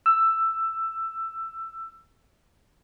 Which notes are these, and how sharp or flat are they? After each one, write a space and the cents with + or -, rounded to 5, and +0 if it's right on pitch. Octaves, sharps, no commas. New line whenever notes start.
E6 +10